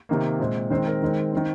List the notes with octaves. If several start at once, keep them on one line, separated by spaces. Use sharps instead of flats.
C3 D#3 A#3
A#2 G#3 C4
D#3 G#3 C4 C5
A#4
D#3 G#3 C4
D#3 C4